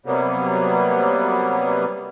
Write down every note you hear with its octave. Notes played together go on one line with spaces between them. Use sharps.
C3 F#3 G3 A#3 B3